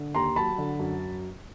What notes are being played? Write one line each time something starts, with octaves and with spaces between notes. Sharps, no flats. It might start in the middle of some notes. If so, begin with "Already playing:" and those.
Already playing: D3
D#2 A#5 C6
F#3 A5 B5
D3
F#2